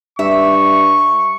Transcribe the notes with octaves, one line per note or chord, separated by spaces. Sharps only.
G2 E5 C#6